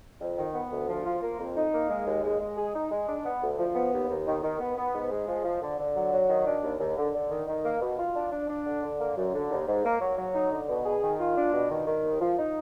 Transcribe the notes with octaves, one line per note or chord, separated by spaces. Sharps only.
F2
D#3
B3
D2
F3
F4
A#3
F2
D#4
A#3
G#3
D#2
G#3
G#3
G#4
D#4
G#3
D4
B3
D2
F3
B3
D#2
D#2
D#3
D#3
B3
B3
G#2
G#3
F3
F3
D3
D3
F#3
F#3
D#3
D4
D#2
D#2
D3
D3
D#3
D#3
A#3
B2
F4
D4
D4
D4
D3
D3
A#3
F#2
D3
D#2
G#2
A#3
F#3
F#3
D#4
D3
B2
G#4
D#3
F4
D4
B2
D#3
D#3
D#2
F3
D#4